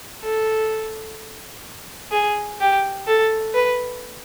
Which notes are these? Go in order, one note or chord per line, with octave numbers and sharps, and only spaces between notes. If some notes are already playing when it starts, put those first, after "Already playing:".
A4
G#4
G4
A4
B4